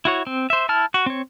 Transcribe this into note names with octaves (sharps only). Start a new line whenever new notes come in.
E4 F#4 C#5
C4
C5 E5
E4 A5 F6
F#4
C4 C#5